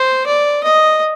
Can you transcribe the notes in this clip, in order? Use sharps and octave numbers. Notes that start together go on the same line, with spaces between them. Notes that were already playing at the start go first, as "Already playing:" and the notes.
Already playing: C5
D5
D#5